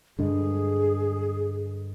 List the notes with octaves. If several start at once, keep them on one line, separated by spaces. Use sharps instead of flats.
G2 D3 G#3 G#4